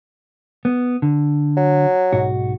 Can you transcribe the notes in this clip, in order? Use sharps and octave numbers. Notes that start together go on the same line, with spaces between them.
B3
D3
F#3
B1 G#2 F#4